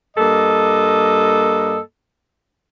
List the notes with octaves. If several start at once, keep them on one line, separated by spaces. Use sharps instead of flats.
G2 A#3 A4 D#5